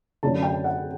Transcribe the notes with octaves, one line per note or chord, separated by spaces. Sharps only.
F#2 D3 A3 C#4 A5
G5
F#5